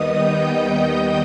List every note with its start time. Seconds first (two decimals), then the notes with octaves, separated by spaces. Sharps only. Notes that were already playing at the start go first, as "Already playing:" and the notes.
Already playing: D#2 D#3 G3 B3 D#4 D#5 D#6
0.11 G5 G6